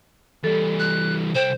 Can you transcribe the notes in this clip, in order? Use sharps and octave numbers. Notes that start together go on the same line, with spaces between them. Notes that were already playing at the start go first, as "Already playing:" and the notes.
E3 G3 A4
F#6
C2 C5 G5